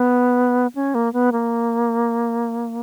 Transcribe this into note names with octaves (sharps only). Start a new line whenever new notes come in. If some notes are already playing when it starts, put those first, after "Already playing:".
Already playing: B3
C#4
A#3
B3
A#3